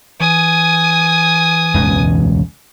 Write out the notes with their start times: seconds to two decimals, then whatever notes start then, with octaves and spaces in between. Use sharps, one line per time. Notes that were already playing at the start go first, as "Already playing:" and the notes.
0.20 E3 G#5 D#6
1.74 E1 C#2 F#2